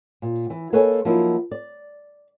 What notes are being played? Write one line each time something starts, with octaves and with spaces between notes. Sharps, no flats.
A#2
E3
A#3 A4 B4 C#5 D#5 G#5
F3 F#3 A#3 D#4 E4 F#4
D5